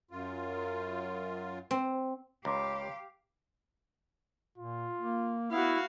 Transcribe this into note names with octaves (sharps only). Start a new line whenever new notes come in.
F#2 F4
C4
C#2 G4 F5 A#5 C6 D6
A#2 F4
A#3
B3 E4 F#4 F5